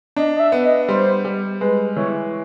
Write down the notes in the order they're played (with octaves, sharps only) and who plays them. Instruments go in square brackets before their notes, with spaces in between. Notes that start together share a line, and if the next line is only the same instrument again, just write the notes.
[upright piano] D4 [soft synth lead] D#5
[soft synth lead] D#5
E5
[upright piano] B3
[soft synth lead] D#5
[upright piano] G3 [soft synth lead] C5
[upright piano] G3
[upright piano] G#3 [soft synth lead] B4
[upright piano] E3 [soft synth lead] C#5